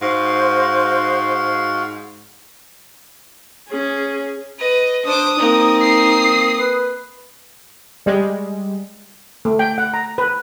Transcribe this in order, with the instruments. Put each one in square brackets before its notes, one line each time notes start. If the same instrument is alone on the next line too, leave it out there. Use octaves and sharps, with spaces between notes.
[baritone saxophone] G#2 [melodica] F#4 F5 C6 [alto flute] C5
[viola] C#4 G#4
[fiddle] B4 D#5
[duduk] D4 [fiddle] C5 D6 [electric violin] D#6
[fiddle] A#3 C4 [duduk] D#4
[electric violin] D#6 C7
[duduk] B4
[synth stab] G3 G#3
[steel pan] A3
G5
F#5
A#5
B4